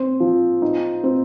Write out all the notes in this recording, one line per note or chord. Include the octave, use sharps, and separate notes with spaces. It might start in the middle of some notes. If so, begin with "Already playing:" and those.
Already playing: C4
F3
D#4
C4